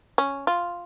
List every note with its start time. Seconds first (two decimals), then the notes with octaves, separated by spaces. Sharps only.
0.18 C#4
0.47 F4